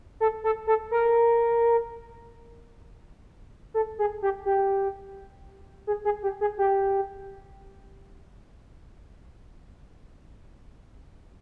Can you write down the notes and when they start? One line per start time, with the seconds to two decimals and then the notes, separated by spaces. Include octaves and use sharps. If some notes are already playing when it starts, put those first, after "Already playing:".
0.20 A4
0.44 A4
0.67 A4
0.91 A#4
3.74 A4
3.99 G#4
4.22 G4
4.46 G4
5.87 G#4
6.05 G#4
6.23 G4
6.41 G#4
6.58 G4